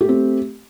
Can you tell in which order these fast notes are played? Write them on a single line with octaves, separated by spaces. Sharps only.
G4 A3 C4